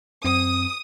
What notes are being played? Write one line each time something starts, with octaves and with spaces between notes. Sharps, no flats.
F#2 C4 D#6